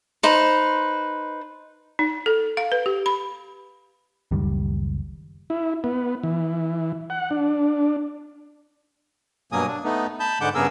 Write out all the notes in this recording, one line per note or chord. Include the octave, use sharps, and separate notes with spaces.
D#4 B4 C5
D#4
A4
F5
B4
G4
B5
F#1 C#2 D#3 G3
E4
B3
E3
F#5
D4
G2 B2 F#3 A#3 G#5 D#6
D4
A3 B3 D#4
A5 B5 G6
G#2 D3 G#3 F#5 D6 G6
G2 C#3 B3 G#4 A#4 E6